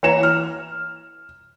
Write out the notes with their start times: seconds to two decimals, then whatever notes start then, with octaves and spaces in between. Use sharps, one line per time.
0.03 E3 C#5 A#5 E7
0.23 F6